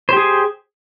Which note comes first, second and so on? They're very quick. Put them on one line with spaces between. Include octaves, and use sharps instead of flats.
C5 G4 G#4